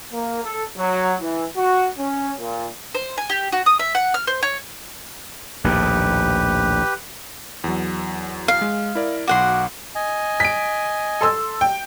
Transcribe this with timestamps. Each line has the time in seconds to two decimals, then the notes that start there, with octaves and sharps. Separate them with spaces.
0.11 A#3
0.43 A4
0.77 F#3
1.20 E3
1.56 F#4
1.98 C#4
2.38 A#2
2.95 C5
3.18 G#5
3.30 G4
3.52 F#4
3.66 D#6
3.79 E5
3.95 F#5
4.14 F6
4.27 C5
4.43 C#5
5.64 A#1 D#2 A2 G4 B4
7.64 E2 F#3
8.48 F5
8.61 G#3
8.95 E4 A#4 D5
9.28 B1 F#4 F#5 C6 D6
9.95 D#5 G#5
10.40 B6 D7
11.21 A4 C6 E6
11.61 G5